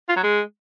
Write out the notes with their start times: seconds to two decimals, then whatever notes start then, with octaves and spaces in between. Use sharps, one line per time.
0.09 F4
0.16 F#3
0.24 G#3